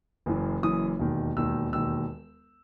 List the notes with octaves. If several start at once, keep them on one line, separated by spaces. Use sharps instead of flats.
F#1 F#2 E3
F#1 F#2 E3 D#6
E1 D#2 D#3
E1 D#2 D#3 E6
E1 D#2 D#3 E6